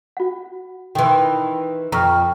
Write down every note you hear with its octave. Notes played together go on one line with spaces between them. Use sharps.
F#4 F#5
D#3 E3 G5 C6
F2 A#5 C#6 F6